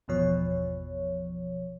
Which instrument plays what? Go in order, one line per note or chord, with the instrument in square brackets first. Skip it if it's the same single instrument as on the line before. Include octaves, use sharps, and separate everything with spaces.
[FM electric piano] G#1 E2 B2 F3 C#5